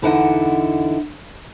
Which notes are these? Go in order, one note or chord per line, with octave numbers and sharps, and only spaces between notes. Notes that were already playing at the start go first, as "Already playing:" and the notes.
E2 D3 D#4 E4 D#5 F#5